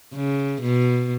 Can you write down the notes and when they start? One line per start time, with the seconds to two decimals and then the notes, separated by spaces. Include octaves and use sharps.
0.15 C#3
0.62 B2